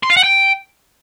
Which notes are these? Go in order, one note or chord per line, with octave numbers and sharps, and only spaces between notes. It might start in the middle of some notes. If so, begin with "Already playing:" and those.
C6
F5
F#5
G5